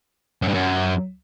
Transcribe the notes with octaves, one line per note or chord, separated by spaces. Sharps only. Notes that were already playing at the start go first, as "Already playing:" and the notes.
F#2
G2
F#2